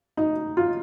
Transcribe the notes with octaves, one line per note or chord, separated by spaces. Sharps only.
D#4
F4